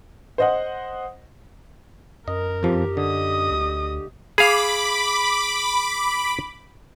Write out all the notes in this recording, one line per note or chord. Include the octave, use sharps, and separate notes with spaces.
C5 D#5 F#5
F#2 A#4 D#5
F2 F3 G4
D3 D#5 D#6
D2
G#4 F5 B5 D6